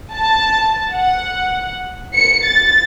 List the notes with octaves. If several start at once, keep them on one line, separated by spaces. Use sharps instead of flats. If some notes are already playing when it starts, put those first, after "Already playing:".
A5
F#5
C#7
A6